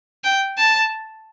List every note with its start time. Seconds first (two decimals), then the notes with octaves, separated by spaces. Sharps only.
0.24 G5
0.58 A5